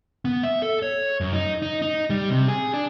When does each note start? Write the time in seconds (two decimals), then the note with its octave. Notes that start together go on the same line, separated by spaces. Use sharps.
0.25 B3
0.43 E5
0.62 A4
0.82 C#5
1.20 F#2
1.33 D#4
1.62 D#4
1.82 D#4
2.10 G3
2.30 C3
2.48 G#4
2.74 D4